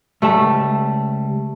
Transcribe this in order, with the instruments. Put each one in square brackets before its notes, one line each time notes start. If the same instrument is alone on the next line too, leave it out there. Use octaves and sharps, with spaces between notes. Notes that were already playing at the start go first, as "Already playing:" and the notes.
[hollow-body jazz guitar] C#2 G3 A5 [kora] A3